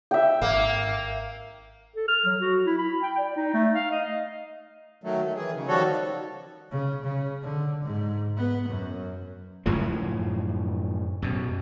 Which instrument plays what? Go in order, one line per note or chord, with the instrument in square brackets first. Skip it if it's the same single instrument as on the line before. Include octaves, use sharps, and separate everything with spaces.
[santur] E5 G5
[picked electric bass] G#1 [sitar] A#3
[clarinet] A4
F6
F#3
F#4
E4
B5
G5
D5
D#4
A3
F5
D#5
[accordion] D#3 F#3 A3
A3
D#3 E3 G#4
C#3
D#3 F3 G3 F#4 A4 C#5
[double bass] C#3
C#3
D3
G#2
B3
F#2
[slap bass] F#2 A2 C#3 F3
F#2 B2